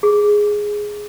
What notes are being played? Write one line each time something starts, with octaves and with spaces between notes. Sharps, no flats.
G#4